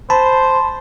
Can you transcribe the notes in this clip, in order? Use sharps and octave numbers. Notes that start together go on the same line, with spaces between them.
C5 A5 B5